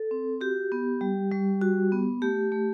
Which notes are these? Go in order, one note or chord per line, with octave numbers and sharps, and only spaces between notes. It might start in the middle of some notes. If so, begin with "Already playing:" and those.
Already playing: A4
C4
F#4 G4
B3
G3
G3
F#4
B3
A3 G4
A3